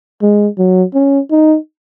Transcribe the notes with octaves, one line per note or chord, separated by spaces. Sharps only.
G#3
F#3
C#4
D#4